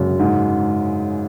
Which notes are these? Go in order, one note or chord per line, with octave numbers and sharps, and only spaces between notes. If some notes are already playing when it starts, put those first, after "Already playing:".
Already playing: F#2 C#3
G#2